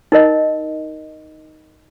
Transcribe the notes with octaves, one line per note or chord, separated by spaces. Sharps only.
D#4 A#4 D#5